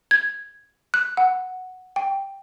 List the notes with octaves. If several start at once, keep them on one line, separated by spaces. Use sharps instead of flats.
G#6
F#6
F#5
G5